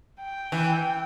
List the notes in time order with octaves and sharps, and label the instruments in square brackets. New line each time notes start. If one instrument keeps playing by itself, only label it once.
[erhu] G5
[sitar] E3